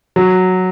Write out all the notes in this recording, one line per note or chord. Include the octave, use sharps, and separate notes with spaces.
F#3